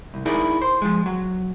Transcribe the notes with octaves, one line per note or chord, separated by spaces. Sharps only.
C2
D#4 E4 G#4 A#4 D5
C5
F3 G#3
F#3